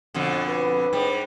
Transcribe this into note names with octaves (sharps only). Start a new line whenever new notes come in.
F2 B2 D3
B4
G#2 G3